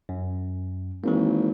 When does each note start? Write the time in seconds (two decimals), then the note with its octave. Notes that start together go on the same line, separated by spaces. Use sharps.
0.09 F#2
1.04 G#1 E3 A#3